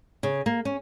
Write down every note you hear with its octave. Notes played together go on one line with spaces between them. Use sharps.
C#3
A#3
C#4